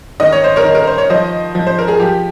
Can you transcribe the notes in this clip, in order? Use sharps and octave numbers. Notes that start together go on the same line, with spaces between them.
D#3 D#5
C#5
C5
A#4 C#5
D#3
A#4
C5
C#5
F3 C5 D#5
F3
C5
A#4
G#4
F3 G4